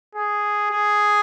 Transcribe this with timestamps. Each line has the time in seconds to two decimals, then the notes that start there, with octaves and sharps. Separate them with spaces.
0.15 G#4
0.71 G#4